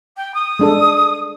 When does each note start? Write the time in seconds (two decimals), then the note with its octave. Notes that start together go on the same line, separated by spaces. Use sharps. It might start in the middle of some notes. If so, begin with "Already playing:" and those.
0.16 G5
0.34 D#6
0.59 G#3 D4 A4